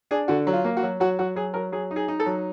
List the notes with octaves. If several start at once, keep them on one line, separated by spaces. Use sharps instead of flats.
D4 G#4
D3 F#4
F#3
F4
A#3
F#4
F#3
F#3 F#4
F#3 F#4
F#3 G#4
F#3 A#4
F#3 G#4
D#4
G#4
D#4
A4
F#3